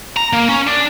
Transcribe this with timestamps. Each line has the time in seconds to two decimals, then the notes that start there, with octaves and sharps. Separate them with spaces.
0.17 A#5
0.33 A#3
0.48 C#4
0.67 D4